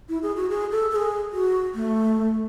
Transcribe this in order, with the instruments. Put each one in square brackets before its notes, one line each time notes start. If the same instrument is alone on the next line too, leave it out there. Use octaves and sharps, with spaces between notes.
[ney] E4
G#4
F#4
G#4
A4
A4
G#4
F#4
A3